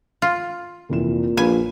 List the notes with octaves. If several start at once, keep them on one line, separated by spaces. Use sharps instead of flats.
F4
F1 A#2 E3 E7
A#1 B4 F5 G#5 B5